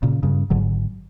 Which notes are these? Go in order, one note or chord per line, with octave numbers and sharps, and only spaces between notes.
A#2 C#3
G2 C#3
G#1 G#2 D3 F#3